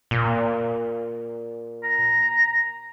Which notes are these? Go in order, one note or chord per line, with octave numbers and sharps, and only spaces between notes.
A#2
A#5